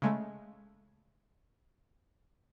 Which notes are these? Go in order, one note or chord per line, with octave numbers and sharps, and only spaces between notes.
C#3 G#3 A3